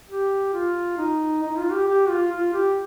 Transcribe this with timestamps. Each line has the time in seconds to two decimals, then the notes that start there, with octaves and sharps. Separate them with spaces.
0.08 G4
0.53 F4
0.98 D#4
1.42 D#4
1.58 F4
1.72 G4
1.88 G4
2.09 F4
2.32 F4
2.54 G4